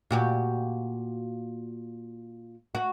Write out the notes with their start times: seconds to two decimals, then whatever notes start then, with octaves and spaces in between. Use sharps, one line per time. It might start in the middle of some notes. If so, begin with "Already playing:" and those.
0.11 A#2 F#4 G4
2.75 F#4